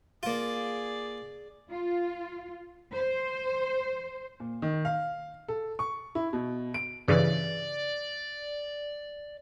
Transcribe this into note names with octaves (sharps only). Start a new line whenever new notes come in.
A#3 F4 G#4 D5
F4
C5
A#2
D#3
F5
A4
C#6
E4
B2
D7
G2 C#3 E3 D5